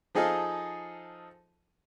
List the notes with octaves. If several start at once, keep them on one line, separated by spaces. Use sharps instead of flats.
F3 D#4 G#4 A4 D#5 F5